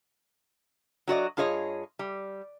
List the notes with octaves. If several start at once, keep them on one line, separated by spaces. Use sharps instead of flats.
F#3 F#4 D5 D#5
G2 F4 G#4 C#5 D#5
G3